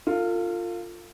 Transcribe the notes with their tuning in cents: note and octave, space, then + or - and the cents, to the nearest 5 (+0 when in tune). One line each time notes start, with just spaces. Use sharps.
F4 +0 A4 +45